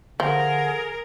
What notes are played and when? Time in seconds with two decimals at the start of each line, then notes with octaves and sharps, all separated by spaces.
0.20 D3 F3 G#4 A#4